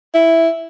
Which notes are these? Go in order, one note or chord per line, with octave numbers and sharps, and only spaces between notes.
E4